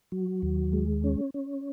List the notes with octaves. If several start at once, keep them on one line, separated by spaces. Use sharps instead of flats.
F#3
D#2
G#3
C#4
C#4